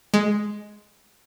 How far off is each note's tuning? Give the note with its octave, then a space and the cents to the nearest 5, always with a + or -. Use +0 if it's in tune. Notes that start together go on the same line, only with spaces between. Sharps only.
G#3 +5